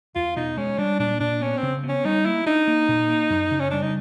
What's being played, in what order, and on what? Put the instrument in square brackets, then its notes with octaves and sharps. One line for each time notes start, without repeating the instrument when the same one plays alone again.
[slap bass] E2 [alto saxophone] F4
[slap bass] B2 [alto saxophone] D#4
[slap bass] G#3 [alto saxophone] C#4
[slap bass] G3 [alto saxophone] D4
[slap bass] A#2 [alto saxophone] D4
[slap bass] A#2 [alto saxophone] D4
[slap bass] B3 [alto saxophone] C#4
[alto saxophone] C4
[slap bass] C#3
B3
[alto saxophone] C#4
[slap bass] G3 [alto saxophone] D#4
[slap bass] A#3 [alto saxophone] E4
[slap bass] D4 [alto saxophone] D#4
[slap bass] A#3
A#2
A#3
F#2
C#3
[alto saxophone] C#4
[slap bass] G3 [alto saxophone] D4
[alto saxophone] D#4